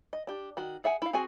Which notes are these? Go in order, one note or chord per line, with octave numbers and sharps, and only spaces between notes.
D#5
D4 G4
D#3 F#4
G#4 E5 F#5 G#5
E4 F5
C4 F#4 G#4 G#5